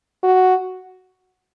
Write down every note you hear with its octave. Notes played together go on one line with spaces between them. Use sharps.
F#4